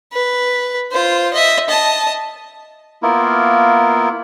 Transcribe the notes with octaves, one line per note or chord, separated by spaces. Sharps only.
B4
F4 C5
D#5 E5
D#5 A5
A#3 B3 E4 F4 A#4